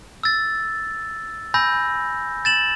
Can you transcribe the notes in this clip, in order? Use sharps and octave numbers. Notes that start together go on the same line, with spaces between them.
E6 A6
G#5 B5 E6 G6 A#6
A6 E7 F#7